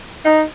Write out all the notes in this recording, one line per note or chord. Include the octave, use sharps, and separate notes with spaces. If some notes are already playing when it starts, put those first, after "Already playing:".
D#4